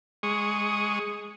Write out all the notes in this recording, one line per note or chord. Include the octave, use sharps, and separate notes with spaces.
G#3 C#6 D#6